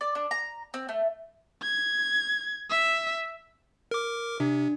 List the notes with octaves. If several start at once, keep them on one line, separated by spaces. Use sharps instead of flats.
D5
D4
A#5
C4
A3
G#6
E5
A#4 D6
C3 D4